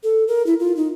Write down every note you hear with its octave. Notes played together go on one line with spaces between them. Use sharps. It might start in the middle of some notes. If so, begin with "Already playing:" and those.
A4
A#4
E4
F4
D#4